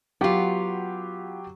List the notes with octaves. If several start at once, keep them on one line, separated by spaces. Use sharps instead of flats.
F#3 B3 F4 G4